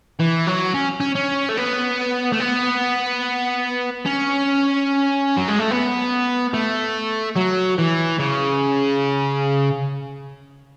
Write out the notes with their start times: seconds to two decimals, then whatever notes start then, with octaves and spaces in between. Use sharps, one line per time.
0.19 E3
0.47 F#3
0.74 C#4
1.00 C#4
1.15 C#4
1.49 A3
1.57 B3
2.32 A3
2.40 B3
4.06 C#4
5.37 F#3
5.48 G#3
5.59 A3
5.71 B3
6.54 A3
7.36 F#3
7.78 E3
8.19 C#3